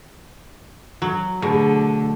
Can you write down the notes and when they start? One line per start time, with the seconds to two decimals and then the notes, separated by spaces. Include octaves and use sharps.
1.02 F#3
1.42 B2 D3 A3 G#4